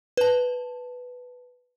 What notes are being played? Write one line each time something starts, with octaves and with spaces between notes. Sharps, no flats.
B4 A5